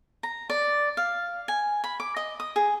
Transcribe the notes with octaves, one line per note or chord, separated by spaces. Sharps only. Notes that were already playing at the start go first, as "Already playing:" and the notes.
A#5
D5
F5
G#5
B5
D6
D#5
D#6
G#4